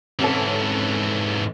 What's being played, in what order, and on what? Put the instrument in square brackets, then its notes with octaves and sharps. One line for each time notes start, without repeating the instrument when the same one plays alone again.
[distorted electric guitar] G#2 E3 [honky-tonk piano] C3 C#4 A4